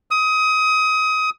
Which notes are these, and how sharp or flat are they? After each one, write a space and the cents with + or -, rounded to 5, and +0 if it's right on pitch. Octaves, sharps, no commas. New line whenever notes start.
D#6 +25